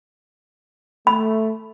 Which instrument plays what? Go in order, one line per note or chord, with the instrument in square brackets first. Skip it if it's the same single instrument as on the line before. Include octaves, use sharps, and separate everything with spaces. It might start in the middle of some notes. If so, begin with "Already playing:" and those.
[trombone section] A3 [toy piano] B5